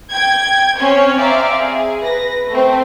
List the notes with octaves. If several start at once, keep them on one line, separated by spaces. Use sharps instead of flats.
G5 G#6
C4 C#4 C#5
C4 D5 E5 F5 A#5
G#4
B4 A#6
A3 C4